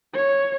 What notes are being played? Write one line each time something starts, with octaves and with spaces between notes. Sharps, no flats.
C#5